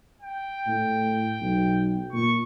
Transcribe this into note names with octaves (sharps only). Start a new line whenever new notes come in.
G5
A2
B1
A#2 C#6